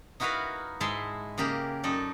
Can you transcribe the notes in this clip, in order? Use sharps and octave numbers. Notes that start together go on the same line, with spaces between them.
D#4 E4 F#4 A#4 B4 F5
G#2 G#3 E4 E5 A5 C6
C#3 A#3 G4 G#4 A#4
F#2 D#4 A4 D5